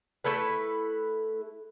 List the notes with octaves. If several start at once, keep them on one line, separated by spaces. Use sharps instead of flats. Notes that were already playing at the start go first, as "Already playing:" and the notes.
A3 E4 A4 B4